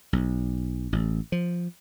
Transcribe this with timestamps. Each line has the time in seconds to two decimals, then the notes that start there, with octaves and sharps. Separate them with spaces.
0.13 B1
0.93 A1
1.32 F3